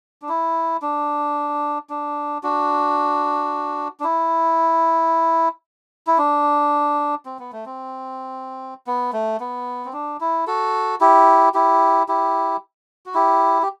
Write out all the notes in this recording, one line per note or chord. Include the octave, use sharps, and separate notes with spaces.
D4
E4
D4
D4
D4 F#4
D4
E4
E4
D4
C4
B3
A3
C4
B3
A3
B3
C4
D4
E4
F#4 A4
E4 G4
E4 G4
E4 G4
F#4
E4 G4
G4